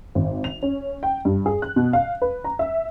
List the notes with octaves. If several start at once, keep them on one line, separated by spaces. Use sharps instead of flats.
G#1
F7
C#4
G5
G2
G#4
F#6
B2
F5
B4
A#5
E5